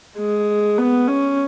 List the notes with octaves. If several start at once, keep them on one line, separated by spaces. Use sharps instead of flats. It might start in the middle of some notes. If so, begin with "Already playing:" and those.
G#3
B3
C#4